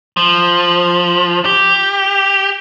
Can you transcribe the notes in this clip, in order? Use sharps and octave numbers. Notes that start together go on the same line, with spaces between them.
F3
G4